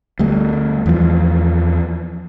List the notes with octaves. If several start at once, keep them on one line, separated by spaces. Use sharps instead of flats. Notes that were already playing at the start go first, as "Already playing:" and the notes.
D2 G3 A3
E2 F3